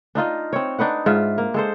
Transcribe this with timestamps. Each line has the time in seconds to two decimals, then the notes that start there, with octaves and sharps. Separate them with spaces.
0.15 D4 D#4 F4 D#5
0.53 C4 C#5
0.79 D4 D#4 B4 F#5
1.06 G#2 F4 E5
1.38 A#3
1.54 G#3 A4 C5